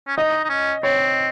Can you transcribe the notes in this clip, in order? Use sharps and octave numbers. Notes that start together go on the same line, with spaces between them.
C#4
D#4 D#5
D#4
C#4
C4 C#5